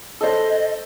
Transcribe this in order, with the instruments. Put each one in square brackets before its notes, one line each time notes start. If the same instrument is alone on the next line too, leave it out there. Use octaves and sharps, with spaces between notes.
[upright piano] A4 C5 [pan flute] D#5